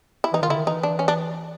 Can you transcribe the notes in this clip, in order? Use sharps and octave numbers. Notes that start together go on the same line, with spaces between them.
E4
E3 D#4
D#3 F4
D3 E4
D#3
E3 D#4
D4
C#4
D4